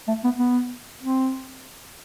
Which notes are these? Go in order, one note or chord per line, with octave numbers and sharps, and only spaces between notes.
A3
B3
B3
C4